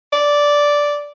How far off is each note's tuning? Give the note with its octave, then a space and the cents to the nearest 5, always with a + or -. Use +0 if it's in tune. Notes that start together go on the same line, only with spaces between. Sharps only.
D5 -5